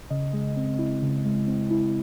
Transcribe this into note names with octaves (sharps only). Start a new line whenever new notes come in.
C#3 D#5
G#3
C4
E4
C#3
G#3
C4
E4